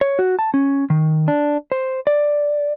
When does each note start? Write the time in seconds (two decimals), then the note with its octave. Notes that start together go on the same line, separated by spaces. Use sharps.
0.01 C#5
0.19 F#4
0.39 A5
0.54 C#4
0.90 D#3
1.28 D4
1.72 C5
2.07 D5